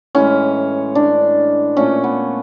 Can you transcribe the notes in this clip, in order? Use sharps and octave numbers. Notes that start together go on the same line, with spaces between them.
A2 E3 G#3 C#4
D4
A#2 F3 A3 C#4
B3